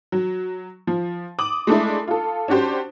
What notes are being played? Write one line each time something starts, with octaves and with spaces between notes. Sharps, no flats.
F#3
F3
D6 D#6 F#7
G#3 A3 D4 E4
F4 A4
C#4 D4 F#4 G4 C5